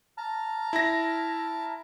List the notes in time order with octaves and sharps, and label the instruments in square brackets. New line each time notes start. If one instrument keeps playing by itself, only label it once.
[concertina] A5 A#5 F6
[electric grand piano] E4 A#6